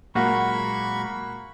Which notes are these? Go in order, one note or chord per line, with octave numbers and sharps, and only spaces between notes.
A#2 F#3 G#3 A#3 F#4 B5 C#6